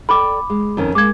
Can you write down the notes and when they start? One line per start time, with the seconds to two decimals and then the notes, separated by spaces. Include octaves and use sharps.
0.09 A4 D5 G5 B5 D6
0.50 G#3
0.77 F2 D#3 C#4
0.95 G#3 A#3 D6 G#6